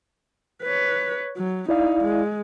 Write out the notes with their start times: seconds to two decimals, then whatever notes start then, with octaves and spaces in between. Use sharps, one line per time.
0.63 B4 C#5
1.37 F#3
1.69 D#4 E4 D5 F5
2.04 G#3